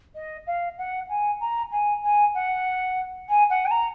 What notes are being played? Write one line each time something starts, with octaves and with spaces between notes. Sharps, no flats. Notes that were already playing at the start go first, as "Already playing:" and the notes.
D#5
F5
F#5
G#5
A#5
G#5
G#5
F#5
G#5
F#5
G#5
A#5